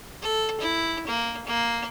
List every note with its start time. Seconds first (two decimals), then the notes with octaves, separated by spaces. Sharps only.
0.22 A4
0.60 E4
1.07 A#3
1.46 A#3